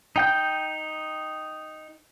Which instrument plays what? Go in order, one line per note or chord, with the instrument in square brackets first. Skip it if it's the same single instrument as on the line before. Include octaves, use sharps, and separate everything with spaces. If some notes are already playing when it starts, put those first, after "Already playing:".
[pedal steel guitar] D#4 G5 G6